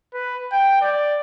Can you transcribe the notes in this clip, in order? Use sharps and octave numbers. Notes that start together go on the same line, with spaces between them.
B4
G5
D5